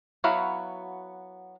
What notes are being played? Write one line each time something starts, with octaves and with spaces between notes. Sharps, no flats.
F#3 B3 E4 F#4 F5